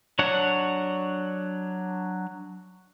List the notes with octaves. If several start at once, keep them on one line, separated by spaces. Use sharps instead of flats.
F#3 D4 C#5 F#5